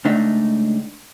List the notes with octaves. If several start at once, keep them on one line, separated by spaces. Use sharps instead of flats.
C#2 A3 D4 D#4 E5